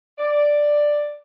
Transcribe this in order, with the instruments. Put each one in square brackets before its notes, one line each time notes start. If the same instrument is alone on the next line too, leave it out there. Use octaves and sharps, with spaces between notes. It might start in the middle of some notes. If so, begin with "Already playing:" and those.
[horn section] D5